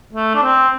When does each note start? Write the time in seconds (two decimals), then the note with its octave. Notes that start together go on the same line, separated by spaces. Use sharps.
0.13 A3
0.35 D4
0.43 C4